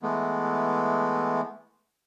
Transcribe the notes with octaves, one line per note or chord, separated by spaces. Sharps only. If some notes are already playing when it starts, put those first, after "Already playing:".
E3 G#3 A3 B3